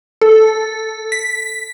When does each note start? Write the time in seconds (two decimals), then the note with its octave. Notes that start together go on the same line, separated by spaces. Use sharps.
0.22 A4
1.12 B6